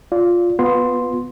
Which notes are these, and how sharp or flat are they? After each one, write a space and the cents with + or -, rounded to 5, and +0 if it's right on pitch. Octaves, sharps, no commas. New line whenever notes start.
F4 +5 D5 -20
B3 +5 F4 +35 C6 +0